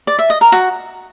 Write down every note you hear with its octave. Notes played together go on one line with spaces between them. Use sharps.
D5
E5
D#5
A#4
F#4